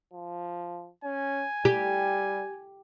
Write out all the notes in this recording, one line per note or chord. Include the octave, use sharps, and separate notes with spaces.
F3
C#4 G#5
G3 G4